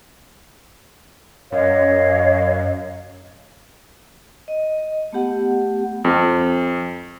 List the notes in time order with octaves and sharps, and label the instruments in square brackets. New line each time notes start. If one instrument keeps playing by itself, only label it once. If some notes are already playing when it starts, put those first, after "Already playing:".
[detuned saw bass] F#2 [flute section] C#5 D#5 F5
[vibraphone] D#5
A3 B3 G4 F#5
[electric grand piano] F2